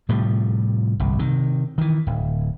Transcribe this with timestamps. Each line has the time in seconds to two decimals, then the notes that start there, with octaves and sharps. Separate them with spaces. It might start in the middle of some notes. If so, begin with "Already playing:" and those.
0.09 A2 C3 F3 G3
1.00 G1 C2
1.19 C3 D#3
1.78 D#3 E3
2.07 D1